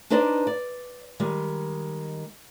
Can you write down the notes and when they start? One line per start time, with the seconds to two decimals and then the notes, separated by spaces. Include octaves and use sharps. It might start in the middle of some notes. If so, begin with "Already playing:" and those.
0.10 D4 D#4 B4 C5 D5 D#5
0.47 D5
1.20 D#3 G3 G#3